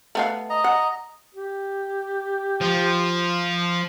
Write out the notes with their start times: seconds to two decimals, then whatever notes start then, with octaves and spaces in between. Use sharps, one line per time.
0.15 A3 B3 F5
0.50 D#5 A#5
0.64 F#5
1.34 G4
2.61 F3